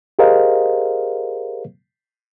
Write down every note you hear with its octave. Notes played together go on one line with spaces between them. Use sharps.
G4 G#4 A#4 C5 D#5 F5